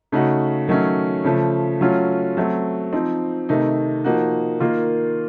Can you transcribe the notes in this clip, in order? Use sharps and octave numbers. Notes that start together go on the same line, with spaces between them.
C#3 A3 D#4 F#4
D#3 F#3 A3 C#4
C#3 F3 A3
F#3 A3 C#4 F4
F#3 A3 C4
F3 C4 D#4
C3 D#3 A3 D#4
F3 A#3 D#4 F#4
D#3 A#3 F4